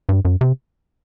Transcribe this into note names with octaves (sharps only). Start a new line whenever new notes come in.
G2
F#2
C3